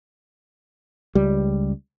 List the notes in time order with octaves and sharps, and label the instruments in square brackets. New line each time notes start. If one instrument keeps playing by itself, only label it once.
[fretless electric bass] C#2 G3